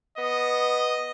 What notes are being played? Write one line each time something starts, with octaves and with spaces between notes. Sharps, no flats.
B3 D#5